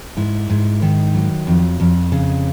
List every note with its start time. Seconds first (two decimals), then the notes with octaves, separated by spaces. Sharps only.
0.17 G#2 E4
0.49 G#2
0.82 D#3
1.14 F#3
1.47 F2
1.80 F2
2.12 C#3